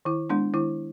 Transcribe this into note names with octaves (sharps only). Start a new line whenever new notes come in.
D#3 E4
G#3 B3 D4
D#3 E4